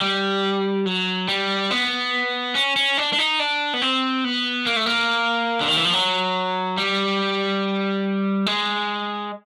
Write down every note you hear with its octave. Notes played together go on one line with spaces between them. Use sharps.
G3
F#3
G3
B3
C#4
C#4
D4
D4
D#4
D4
B3
C4
B3
A#3
A3
A#3
D3
D#3
E3
F3
F#3
G3
G#3